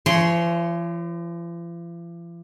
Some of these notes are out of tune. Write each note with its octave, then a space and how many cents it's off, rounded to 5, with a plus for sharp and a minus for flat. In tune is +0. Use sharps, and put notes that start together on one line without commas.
F3 -45 C#5 +0 C6 -5